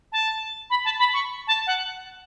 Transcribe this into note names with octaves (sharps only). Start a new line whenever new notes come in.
A5
B5
A5
B5
C#6
A5
F#5